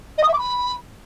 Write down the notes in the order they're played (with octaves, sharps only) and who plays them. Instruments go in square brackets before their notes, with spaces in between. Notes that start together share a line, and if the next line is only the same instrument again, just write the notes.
[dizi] D#5
D#6
E5
D6
B5